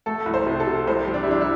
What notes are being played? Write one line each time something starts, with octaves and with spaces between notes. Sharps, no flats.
A3 A4
C2
C5
C3
A4
C3
C2 C5
G3
D4
E4
G3 D4
E4